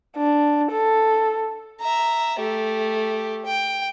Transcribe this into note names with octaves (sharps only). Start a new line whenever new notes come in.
D4
A4
E5 A#5
A3 G4
G5